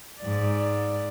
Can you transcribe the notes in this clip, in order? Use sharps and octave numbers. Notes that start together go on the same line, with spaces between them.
G#2 D5